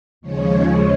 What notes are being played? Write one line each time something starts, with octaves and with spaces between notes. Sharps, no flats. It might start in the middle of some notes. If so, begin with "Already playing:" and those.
D#2 C#3 F3 G#3 C#5
C#5